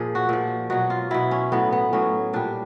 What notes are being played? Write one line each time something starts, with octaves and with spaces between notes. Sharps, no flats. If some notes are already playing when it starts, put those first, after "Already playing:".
Already playing: A#2 F3 G#4
F#4
A#2 F3
B2 F#3 F#4
F4
B2 F#3 E4
C#4
A2 F#3 B3
B3
A2 F#3 C#4
A#2 G3 D4